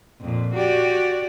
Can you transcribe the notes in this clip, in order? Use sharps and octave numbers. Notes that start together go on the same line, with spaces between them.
F2 A#2
F#4 G4 D5